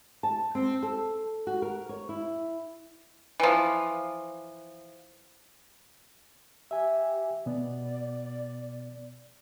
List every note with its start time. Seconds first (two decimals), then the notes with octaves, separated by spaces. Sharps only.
0.23 A5
0.55 C4
0.83 A4
1.47 F#4
1.62 A#4
1.89 C#5
2.09 E4
3.40 E3 F3
6.71 G4 E5 G#5
7.46 B2 B3 D5